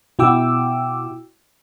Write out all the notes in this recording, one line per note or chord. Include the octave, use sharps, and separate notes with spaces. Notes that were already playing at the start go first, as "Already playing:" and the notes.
B2 E4 F#4 G5 D6 E6